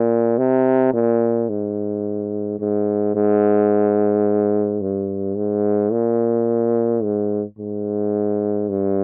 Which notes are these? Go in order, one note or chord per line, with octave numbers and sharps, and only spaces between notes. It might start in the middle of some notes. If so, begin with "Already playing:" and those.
Already playing: A#2
C3
A#2
G#2
G#2
G#2
G2
G#2
A#2
G#2
G#2
G2